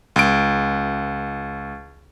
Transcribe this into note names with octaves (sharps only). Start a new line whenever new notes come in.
C#2 D7